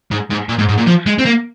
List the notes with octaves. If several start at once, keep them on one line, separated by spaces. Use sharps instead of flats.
G#2
G#2
A#2
G#2
G#2
A#2
F3
G#3
C4
A#3